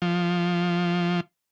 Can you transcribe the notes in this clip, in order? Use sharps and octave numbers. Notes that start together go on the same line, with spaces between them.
F3